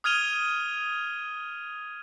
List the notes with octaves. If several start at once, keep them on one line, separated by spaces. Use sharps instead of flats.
D#6 F6 G#6 D#7 F7 G7